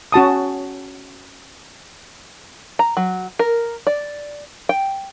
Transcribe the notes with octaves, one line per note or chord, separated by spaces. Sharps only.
C#4 F#4 A5 D#6
A#5
F#3
A#4
D5
G5